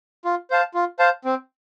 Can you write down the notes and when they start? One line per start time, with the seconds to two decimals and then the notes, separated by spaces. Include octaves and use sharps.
0.25 F4
0.50 C5 F5 A5
0.74 F4
0.99 C5 F5 A5
1.25 C4